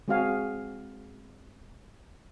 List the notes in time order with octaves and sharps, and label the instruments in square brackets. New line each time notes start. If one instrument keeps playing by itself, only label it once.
[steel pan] G#3 C4 F#4 G#4 F5 G#5